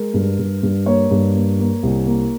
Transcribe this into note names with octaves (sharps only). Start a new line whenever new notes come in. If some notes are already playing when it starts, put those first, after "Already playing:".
Already playing: G#3 A#4
G2
G2
G2
A#3 C#5
G2
A#3
A#3
C2
A#3